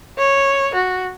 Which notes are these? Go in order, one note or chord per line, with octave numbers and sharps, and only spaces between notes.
C#5
F#4